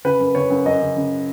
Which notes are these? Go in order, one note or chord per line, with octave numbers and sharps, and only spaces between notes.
C#3 B4
F#2
C#3 C#5
F#2
F#2 D#5
C#3
C#3